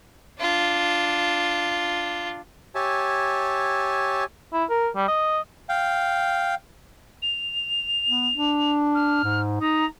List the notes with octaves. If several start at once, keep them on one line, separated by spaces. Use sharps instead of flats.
D4 F4
G4 C#5 E5 G#5 A5
E4
A#4
G3
D#5
F5 G5
F7
B3
D4
F6
G#2
D#4 A#5